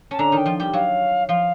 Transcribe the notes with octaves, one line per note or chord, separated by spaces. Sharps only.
C#4 A5
D3 D4 A#5
D#3 D#4 G5
F3 F4
G3 G4
F#3 F#4 F5
F3 F4 F5